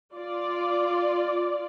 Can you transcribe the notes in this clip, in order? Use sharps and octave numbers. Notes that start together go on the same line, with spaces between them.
F4 D5